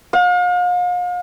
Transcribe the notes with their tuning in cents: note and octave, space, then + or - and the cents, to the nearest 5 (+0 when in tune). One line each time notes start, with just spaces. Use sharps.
F5 +40